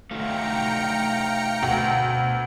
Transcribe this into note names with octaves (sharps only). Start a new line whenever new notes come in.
A3 D#4 F#4 F5 G5 A#5 C#7
D2 B2